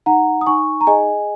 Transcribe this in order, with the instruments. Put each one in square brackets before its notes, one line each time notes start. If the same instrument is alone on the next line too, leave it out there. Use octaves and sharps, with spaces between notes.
[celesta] D#4 F#5 A#5
D#6
D#4 G#5 C#6
A#5
G#4 D#5 G#5